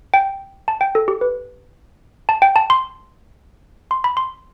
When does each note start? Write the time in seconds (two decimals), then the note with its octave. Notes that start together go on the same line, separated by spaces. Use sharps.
0.14 G5
0.68 A5
0.81 G5
0.95 A4
1.08 G4
1.21 B4
2.29 A5
2.42 G5
2.56 A5
2.70 C6
3.91 C6
4.04 B5
4.17 C6